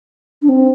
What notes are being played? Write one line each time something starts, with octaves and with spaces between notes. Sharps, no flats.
D4
C4